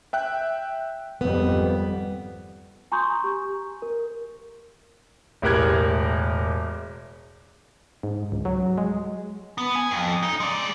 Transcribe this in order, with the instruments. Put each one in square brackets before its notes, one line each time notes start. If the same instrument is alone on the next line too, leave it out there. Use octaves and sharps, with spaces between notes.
[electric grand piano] E5 G5 F#6
[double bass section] G#1 F2 G3 [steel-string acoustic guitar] B3
[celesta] G#5 A#5 C6 C#6 D#6 G6
G4 C#6
A#4
[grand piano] E1 A2 G4 A#4 F#6 G#6
[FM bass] G#2
C#2
F#3
G#3
[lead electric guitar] B3
G#5
F2
D#4
G#3 D5